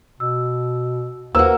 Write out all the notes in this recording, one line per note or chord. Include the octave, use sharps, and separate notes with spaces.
B2 E6
D#2 A#3 F#4 B4 C5 E6